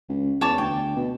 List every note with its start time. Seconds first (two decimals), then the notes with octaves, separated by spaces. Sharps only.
0.09 C#2
0.41 E2 C#5 A5 D6
0.58 D2 G5
0.96 B2